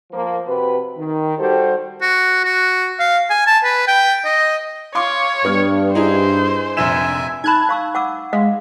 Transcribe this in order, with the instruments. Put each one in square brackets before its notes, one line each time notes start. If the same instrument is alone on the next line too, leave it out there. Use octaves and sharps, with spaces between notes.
[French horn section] F3 A#3
C3 F#4 B4
D#3
G3 F#4 G4 A4 C5
[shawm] F#4
F#4
F5
G#5
A5
B4
G5
D#5
[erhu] C#5 [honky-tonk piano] F5 C6 D6
[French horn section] G2 [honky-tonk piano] B3 F6
[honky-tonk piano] D#4 E4 G#4 [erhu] C5
[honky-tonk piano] F1 A#1 E7 [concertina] E5 G#5
[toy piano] D#4 B5 [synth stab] A5 F#6 G#6
[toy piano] F5 C#6 E6
F#5 D6 E6
[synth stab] G#3 [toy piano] F5